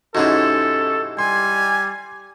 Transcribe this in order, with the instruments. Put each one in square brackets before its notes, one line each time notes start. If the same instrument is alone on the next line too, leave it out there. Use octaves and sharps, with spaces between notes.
[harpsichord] G#2 C3 E3 [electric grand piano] C#4 D#4 F#4 [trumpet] A4
[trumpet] G3 [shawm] G#5 [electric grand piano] C6